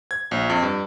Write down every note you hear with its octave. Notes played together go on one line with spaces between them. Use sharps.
G#6
A#1
F2
G2